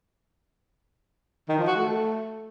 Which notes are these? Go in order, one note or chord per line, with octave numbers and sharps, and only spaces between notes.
D#3
F3
F#4
A3